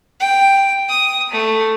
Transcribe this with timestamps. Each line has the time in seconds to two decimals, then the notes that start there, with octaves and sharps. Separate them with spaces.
0.20 G5
0.89 D#6
1.31 A3